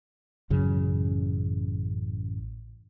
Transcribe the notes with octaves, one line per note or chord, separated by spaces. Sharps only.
A1 F#2 C#3 F#3